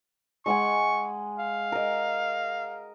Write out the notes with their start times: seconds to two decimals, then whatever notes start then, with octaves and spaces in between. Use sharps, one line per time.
0.46 G#3 F#5 G#5 C#6
1.39 F5
1.72 A#4 D#5